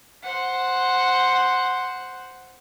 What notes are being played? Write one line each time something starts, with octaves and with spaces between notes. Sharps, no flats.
C5 F#5